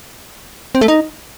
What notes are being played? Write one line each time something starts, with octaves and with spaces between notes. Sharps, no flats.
C4
A3
D#4